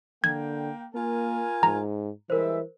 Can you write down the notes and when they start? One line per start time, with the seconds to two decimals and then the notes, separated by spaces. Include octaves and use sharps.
0.24 D3 A#3 G5 G#6
0.95 A#3 F4 A#4 G#5
1.63 G#2 A#5
2.30 E3 G3 G#3 A#4 C5 E5